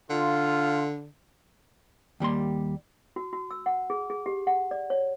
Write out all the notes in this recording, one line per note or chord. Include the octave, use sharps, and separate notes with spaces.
D3 F4
D#2 G3 A#3 C6
F#4
F#4
E6
F#5
G#4
G#4
G4
F#5
D5
C#5